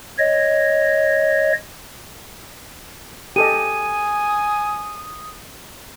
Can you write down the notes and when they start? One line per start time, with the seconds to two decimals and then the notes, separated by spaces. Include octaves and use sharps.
0.19 C#5 D#5
3.36 G4 A4 D#5 G#5 D#6 D#7